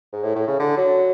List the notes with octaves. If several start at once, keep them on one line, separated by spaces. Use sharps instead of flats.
G#2
A2
A2
C#3
D3
F#3